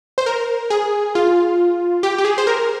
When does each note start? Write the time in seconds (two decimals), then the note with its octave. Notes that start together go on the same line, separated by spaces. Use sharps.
0.18 C5
0.26 A#4
0.70 G#4
1.15 F4
2.03 G4
2.18 G4
2.25 G#4
2.38 C5
2.47 A#4